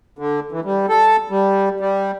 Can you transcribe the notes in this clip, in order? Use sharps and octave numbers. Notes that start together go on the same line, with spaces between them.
D3
E3
G3
A4
G3
G3